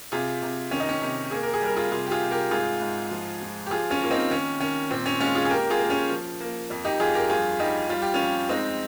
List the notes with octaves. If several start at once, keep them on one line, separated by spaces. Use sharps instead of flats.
C3 F4 G#4
C3
D#3 C#4
D#4
C#4
C3
A#3 G#4
A#4
G#4
G3 A#4
F4 G#4
C3 F4 G#4
G4
F4 G#4
C3
G4 A#4
G#2 F4 G#4
G#2
F3
F3
G4
F3 F4 G#4
C#4 F4
A#3 F4
C4 D#4
D#3 C#4
D#3 C#4
A#2 C4
C#4
G#3 C#4 F4
F4 G#4
G#4
A#3 G4 A#4
F4 G#4
A#3
C#4
F3
A#3
F2
D#4 G4
F2 F4 G#4
G4 A#4
G2 F4 G#4
G3 D#4 G4
G3 F4
G4
C#4 F4
F2
G#3 C4 D#4